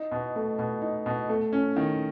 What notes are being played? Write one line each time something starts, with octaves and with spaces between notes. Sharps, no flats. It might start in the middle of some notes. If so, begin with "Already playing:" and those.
Already playing: D#4
B2
A3
B2
D#4
B2
A3
C#4
D#3